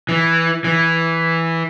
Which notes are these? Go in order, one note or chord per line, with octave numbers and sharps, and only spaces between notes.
E3
E3